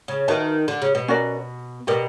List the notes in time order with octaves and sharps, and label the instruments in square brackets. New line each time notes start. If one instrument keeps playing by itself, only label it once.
[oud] C#3
[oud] D#3 [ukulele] F#4 B4 E5 A5
[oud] D3
C#3
B2
[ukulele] C#4 F#4 A#4 D5
[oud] B2 [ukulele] G4 A#4 D5